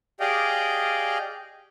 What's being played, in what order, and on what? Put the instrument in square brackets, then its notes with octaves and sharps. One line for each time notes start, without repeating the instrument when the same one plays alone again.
[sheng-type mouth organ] G4 G#4 D5 D#5 F5 G5